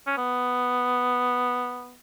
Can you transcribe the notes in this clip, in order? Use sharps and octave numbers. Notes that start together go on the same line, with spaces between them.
C#4
B3